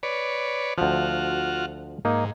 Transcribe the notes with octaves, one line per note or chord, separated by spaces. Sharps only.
B4 C#5 D5
D2 F3 F4 F#4
G#2 A#3 D#4